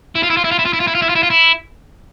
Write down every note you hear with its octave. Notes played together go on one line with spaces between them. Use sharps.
E4
F4
E4
F4
E4
F4
E4
F4
E4
F4
E4
F4
E4
F4
E4
F4
E4